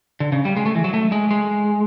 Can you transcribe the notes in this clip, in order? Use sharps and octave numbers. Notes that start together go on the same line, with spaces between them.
D3
C#3
G3
G#3
A3
E3
F#3
A3
G#3
G#3